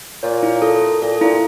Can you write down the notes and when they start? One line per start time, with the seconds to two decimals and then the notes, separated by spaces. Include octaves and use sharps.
0.23 A#2 C#5
0.43 E4
0.62 A4
0.82 A4
1.02 A#2 A4
1.21 A#2 E4